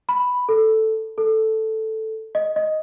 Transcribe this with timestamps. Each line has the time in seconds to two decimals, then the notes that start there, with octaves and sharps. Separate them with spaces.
0.09 B5
0.49 A4
1.18 A4
2.35 D#5
2.56 D#5